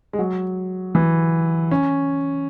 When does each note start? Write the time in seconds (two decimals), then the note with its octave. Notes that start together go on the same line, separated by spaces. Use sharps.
0.13 G#3
0.19 F#3
0.95 E3
1.71 C#4